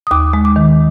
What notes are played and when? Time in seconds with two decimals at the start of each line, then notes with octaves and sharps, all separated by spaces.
0.07 D#6
0.11 D#2 D6
0.33 G#3
0.45 D6
0.56 D#3